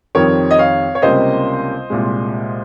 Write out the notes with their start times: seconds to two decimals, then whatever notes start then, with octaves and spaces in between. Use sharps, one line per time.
0.15 F2 D#3 G3 C4 A#4 C#5
0.51 D#5
0.59 C#5 F5
0.95 C#5
1.02 C#2 C3 G3 A#3 C#4 C5 D#5
1.90 C2 A#2 G#3